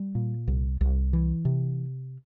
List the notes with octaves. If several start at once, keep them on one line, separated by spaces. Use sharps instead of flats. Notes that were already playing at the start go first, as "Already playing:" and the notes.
Already playing: G3
A#2
C2
C2
E3
C3